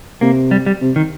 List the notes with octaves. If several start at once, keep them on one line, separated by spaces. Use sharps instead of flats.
C3 A#3
G3
G3
C3
D#3